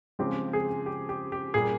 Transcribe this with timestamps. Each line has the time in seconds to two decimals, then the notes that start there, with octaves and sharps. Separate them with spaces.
0.19 C#3 F3 G#3 C4 G4
0.53 G#4
0.86 G4
1.09 G4
1.32 G4
1.54 A#2 G3 A#3 G#4